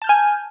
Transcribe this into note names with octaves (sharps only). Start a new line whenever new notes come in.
G#5 A5 F6 G6